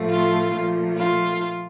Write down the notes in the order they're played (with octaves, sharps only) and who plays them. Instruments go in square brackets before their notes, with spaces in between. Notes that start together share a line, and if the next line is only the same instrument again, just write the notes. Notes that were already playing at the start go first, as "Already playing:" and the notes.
Already playing: [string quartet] A2 F3 A3
F4
A#2 F3 A3
F4